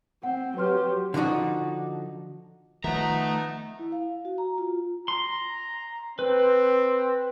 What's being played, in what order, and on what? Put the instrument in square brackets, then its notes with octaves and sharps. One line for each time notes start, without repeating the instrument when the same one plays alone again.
[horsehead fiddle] C4 [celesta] F#5
[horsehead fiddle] F#3 G4 [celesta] B4 C6 F6
[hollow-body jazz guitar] D3 F3 D4 D#4 F#4
[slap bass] D#3 F3 [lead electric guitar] A3 E5 [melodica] B3 D#4 [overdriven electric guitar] A#5
[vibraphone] E4
F5
F#4
A#5
F4
[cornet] A#5 [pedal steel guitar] C6
[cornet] C4 [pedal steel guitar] B4